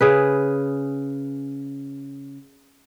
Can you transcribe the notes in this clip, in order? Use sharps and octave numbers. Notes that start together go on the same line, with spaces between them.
C#3 G#4 B4